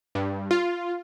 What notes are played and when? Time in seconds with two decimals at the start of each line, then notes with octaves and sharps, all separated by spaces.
0.15 G2
0.51 F4